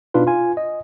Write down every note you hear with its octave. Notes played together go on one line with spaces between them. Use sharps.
B2 D4 D#4 F4 B4
F4 G#5
D#5